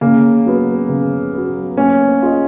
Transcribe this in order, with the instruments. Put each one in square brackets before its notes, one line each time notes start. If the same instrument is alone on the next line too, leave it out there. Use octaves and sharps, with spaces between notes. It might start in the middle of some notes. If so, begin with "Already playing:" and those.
[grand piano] C#3 [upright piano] A#3
[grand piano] F#3 B3
C#3
F#3 B3
[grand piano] A#3 [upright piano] C#4
[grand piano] F4 G#4 D#5